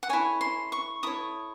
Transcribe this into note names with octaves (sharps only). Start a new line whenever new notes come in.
F#5
E4 A4 C#5 G#5
C6
C#6
E4 A4 C#5 D#6